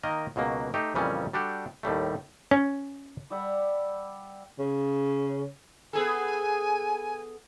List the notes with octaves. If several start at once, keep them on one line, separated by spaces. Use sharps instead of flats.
D#3 A#3 A#4 D#5 A#5
C#2 B2 F#3 A#3
A3 D#4 G4
F2 A#2 C#3 E3 G3 C#4
G3 D4 F#4 G4 A4
D#2 A2 G3 A3
C#4
G3 G4 E5 F#5
C#3
B3 G#4 A4 G#5